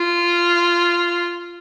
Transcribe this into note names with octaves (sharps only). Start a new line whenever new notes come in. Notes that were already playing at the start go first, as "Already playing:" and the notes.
Already playing: F4